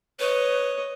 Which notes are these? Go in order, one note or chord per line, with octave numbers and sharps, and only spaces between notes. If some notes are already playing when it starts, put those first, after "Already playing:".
B4 C#5 D#5